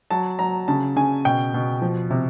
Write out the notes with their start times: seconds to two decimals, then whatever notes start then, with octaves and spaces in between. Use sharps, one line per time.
0.11 F#3 A5
0.39 F#3 A#5
0.68 C#3 A5
0.96 C#3 G#5
1.25 B2 G5
1.54 B2
1.82 F3
2.10 C3